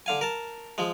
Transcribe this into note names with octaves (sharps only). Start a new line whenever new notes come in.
D3 F5 G#5
A#4 A5
F3 G#3